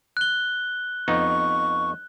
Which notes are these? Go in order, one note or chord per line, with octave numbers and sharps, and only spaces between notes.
F#6 G7
F2 B3 D#4 C#6